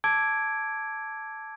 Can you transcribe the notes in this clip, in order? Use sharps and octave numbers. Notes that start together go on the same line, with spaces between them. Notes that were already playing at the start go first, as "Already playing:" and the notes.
A5 D6 E6 G#6 D7